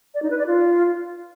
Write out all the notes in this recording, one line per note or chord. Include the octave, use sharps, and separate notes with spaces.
D5
D#4
B4
D5
F4